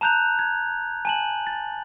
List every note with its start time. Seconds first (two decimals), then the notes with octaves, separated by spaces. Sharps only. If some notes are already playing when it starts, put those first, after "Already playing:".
0.01 A5 A#5 F#6 G6 F7
0.39 G#6
1.05 G#5 A5 F#7
1.47 A6